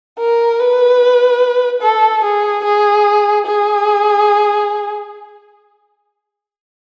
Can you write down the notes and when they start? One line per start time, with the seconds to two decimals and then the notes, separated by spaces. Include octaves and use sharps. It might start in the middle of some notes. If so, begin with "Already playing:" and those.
0.19 A#4
0.60 B4
1.82 A4
2.24 G#4
2.64 G#4
3.46 G#4